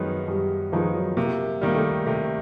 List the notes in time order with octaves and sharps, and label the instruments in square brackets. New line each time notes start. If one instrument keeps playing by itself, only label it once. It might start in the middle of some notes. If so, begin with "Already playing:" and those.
Already playing: [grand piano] F#2 D#3 G#3 B3 D#4 [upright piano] F3 F#3
[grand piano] F#2 [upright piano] G3
[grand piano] D#3 G#3 B3 D#4 [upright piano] F3
[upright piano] F#3
[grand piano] C3 [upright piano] A#3
[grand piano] D#3 G3 [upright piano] A#3
[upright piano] A3
[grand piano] C3 [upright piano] A3